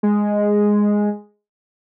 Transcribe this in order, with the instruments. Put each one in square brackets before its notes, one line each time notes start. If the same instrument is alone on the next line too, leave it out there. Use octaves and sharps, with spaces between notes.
[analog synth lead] G#3